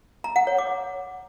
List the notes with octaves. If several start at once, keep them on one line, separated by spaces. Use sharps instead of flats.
A#5
F#5
C#5
D6